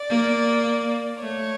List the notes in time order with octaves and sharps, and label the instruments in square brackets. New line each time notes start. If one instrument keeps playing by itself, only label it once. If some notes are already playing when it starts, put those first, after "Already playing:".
Already playing: [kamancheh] D5
[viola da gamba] A#3
[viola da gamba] A3 [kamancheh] C#5